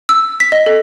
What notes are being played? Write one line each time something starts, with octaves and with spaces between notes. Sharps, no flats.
E6
B6
D#5
A4